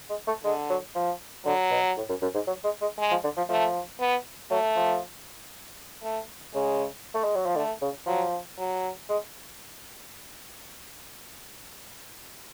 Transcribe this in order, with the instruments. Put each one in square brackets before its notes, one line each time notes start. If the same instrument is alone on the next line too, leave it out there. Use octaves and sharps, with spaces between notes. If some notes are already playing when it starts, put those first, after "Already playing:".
[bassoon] G#3
A3
[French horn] D3 [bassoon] G#3
[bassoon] F#3
F3
[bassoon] D3 [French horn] F#3
[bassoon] B2
A2
F#2
F#2
G#2
F#3
G#3
G#3
[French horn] G#3
[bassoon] F3
D3
F3
[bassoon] F3 [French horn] A3
[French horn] B3
[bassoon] F#3 [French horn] A3
[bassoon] F3
[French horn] A3
[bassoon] C#3 [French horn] G#3
[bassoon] A3
G#3
F#3
F3
[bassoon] D3 [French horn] A3
[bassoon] C#3
[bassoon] F3 [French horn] F#3
[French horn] F#3
[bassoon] G#3